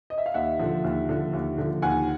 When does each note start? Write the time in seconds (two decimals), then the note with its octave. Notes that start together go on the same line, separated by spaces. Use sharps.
0.10 D#5
0.18 E5
0.26 F5
0.34 D#2 E5 F#5
0.59 D3 F3
0.84 D#2
1.09 D3 F3
1.33 D#2
1.58 D3 F3
1.82 D#2 F#5 G#5